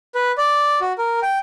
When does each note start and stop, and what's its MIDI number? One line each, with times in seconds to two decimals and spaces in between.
0.15 0.32 71
0.38 0.79 74
0.81 0.93 66
0.98 1.19 70
1.22 1.38 79